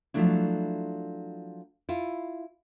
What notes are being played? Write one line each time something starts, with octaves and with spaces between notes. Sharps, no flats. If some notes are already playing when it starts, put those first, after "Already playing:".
F3 F#3 A3 D4 E4
E4 F4